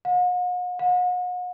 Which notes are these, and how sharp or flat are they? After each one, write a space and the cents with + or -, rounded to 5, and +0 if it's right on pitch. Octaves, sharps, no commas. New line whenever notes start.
F#5 -45
F#5 -40